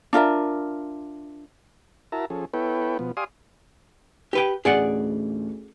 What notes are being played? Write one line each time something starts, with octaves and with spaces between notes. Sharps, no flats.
D4 F4 A#4 E5
E4 F#4 A#4 E5 A5 A#5
F3 C#4 G#4 A4
B3 E4 A4 B4 C#5 G5
B2 F3 B3
G4 D5 F5 G#5 C6 D#6
G4 B4 G5
A1 D2 G#4 D5 F#5